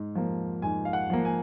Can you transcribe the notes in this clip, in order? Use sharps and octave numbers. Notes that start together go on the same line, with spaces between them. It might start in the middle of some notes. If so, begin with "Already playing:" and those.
Already playing: G#2
F3 A#3
G#2 G#5
F5
F#5
F3 A#3
G#5